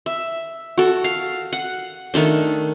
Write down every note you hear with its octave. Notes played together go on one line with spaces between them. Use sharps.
E5
F#4 A4
F5
F#5
D#3 A3 D4